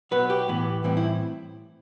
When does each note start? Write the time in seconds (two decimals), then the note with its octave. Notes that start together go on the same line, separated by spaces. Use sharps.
0.11 B2 F#3 B3 B4
0.30 G4
0.48 A2 E3 B3
0.84 A2 E3 G3 C4
0.97 E4